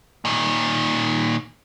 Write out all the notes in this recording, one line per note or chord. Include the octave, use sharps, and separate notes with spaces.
A#2 D#3